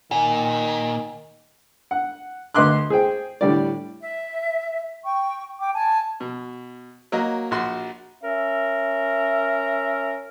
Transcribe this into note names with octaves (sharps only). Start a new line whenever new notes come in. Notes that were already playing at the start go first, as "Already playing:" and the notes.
A#2 D#3 G#5
F#5
D2 B4 D#5 C6 D6 F#6
G#4 C5 G5
A2 D3 G3 D5
E5
G5 C#6
G5 D6
G#5 A5
B2
F#3 A#3 D#5
A#1 F#4 C6
C#4 A#4 E5